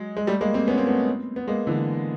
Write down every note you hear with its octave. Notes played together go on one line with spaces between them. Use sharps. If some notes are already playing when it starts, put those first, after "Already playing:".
Already playing: F#3 G#3
G#3
G3 A3
G#3 A#3
A#3 C4
B3 C#4
A#3 C4
A3 B3
B3
G#3 A#3
D3 E3